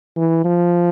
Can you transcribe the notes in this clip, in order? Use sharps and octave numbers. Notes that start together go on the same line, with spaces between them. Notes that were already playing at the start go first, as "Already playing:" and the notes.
E3
F3